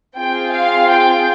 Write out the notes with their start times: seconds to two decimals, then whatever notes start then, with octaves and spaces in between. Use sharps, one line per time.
0.15 C4 F4 G#4 G5
0.52 F5
0.89 G5